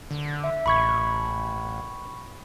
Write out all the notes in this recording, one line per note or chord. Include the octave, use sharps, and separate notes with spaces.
D3
E5
A1 B5 C#6 G#6